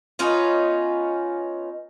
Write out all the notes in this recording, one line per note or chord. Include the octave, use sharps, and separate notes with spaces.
B3 C#4 D#4 F4